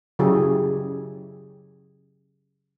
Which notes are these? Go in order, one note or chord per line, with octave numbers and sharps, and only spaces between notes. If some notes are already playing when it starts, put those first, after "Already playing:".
C#3 F#3 E4 G4 G#4